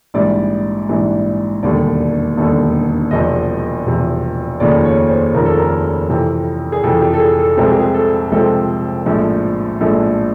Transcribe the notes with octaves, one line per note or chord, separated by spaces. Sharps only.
A#1 G#2 E3 G3 D5
A#1 G#2 E3 G3
E1 D#2 D3 G3 D5
E1 D#2 D3 G3
E1 E2 C3 F3 D#5
E1 E2 C3 F3
F1 D#2 C#3 F3 D5
C#5
C5
F1 D#2 C#3 F3 A#4
A4
A#4
F2 C3 E3
G#4
F2 C3 E3 A4
G4
A4
G#4
A4
C2 C3 F3 G#3 C4 A4
G#4
G4
G#4
A4
C2 C3 F3 G#3 C4 A4
A#1 A2 F3 G#3
A#1 A2 F3 G#3 A4